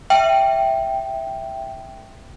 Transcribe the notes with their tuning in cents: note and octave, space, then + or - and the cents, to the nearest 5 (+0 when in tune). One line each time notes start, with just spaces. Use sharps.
E5 +0 G5 +0